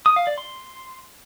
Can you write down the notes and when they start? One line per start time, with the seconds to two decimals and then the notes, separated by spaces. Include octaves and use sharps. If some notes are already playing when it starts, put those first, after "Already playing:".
0.06 D#6
0.16 F5
0.27 D5
0.38 C6